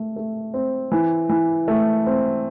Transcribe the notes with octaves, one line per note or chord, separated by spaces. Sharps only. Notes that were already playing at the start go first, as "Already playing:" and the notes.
Already playing: A3
A3
C4
E3
E3
A3
C4